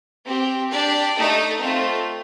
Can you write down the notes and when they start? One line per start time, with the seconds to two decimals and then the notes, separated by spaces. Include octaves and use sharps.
0.26 C4 G4
0.71 D4 G4 D5
1.16 A3 D#4 A4
1.61 A3 C4 F4